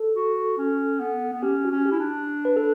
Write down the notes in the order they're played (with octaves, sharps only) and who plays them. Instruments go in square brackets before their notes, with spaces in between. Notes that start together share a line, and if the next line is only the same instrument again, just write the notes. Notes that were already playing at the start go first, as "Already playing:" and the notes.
Already playing: [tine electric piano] A4
[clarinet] F#4
C#4
B3
B3
[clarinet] C#4 [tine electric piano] G4
[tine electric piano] F#4
[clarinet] C#4
[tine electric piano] G4
[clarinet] E4
D4
[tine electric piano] B4
A4